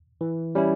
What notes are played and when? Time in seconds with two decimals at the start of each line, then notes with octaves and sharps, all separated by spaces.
0.21 E3
0.55 G3 C#4 E4